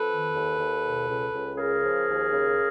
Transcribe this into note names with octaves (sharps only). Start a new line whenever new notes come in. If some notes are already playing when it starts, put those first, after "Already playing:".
Already playing: F2 A4 B4
D#3
D#2
D#2
B2
C#2
C#2
C#3 G#4 A#4
F3
D#2
C#3